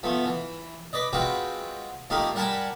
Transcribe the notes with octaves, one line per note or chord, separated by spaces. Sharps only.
F3 A3 B3
E3
B4 D5 D#5
G#3 C4 F4 F#4 B4 G5
F2 A3 A#3 D#4 G4 F5
G3 A#4 F#5 G#5 A5 B5